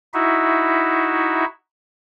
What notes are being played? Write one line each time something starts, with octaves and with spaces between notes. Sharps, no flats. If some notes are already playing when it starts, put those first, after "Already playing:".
D#4 E4 F#4 E5